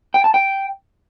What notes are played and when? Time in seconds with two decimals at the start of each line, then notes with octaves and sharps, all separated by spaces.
0.14 G5
0.24 A5
0.34 G5